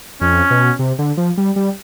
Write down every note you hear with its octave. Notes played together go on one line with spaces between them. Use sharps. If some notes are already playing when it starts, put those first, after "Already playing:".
F2 C#4
B2
C3
D3
F3
G3
G3